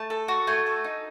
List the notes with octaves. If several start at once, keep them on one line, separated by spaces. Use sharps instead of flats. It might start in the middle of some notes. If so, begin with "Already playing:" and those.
Already playing: A3 A5
A4
F#4
A3 G#5
A4
D#4